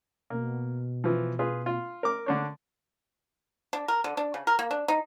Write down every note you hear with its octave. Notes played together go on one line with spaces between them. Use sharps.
B2 A#3
E3 F3
F4 G#4 B4
F4
A#4 D6
D3 D4 C#5
D4
A#4
D3
D4
C#3
A#4
A#3
D4
D#4